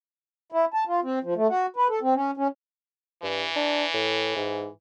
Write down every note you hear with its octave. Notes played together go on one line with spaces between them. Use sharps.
E4
A5
F4
C4
F3
A3
F#4
B4
A4
C4
C#4
C#4
G2 E3
D4
A2
G#2